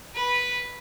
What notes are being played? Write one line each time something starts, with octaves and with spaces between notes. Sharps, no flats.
B4